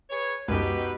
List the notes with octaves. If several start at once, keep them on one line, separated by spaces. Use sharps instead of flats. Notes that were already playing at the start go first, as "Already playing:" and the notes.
G#4 B4 C#5
C#2 F#2 B2 D#4 G4 B4